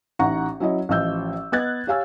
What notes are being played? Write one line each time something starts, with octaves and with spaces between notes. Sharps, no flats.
A1 D#4 F#5 A#5 C#6
F#3 C#4 E4 C#5 D#5
A1 F3 D#5 E6 G6
B3 B4 D#5 F#6 G#6 A6
G4 C#5 F5 G#5 E6